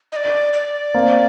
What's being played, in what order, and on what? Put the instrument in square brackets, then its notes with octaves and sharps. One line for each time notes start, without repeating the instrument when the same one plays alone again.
[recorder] D#5
D5
D5
[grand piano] A#3 C4